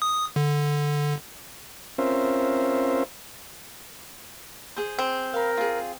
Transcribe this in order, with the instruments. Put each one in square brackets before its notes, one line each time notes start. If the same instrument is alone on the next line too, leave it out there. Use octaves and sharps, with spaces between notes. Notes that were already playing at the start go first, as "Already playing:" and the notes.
[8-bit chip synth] D#6
D3
[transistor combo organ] C4 C#4 F4 A#4 C5 E5
[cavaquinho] G#4 C5
[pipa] C4
[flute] A#4 [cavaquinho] F5 B5
[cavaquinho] F4 G#4